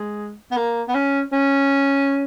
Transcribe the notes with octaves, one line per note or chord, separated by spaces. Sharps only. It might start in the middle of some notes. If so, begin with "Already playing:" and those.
Already playing: G#3
B3
A#3
B3
C#4
C#4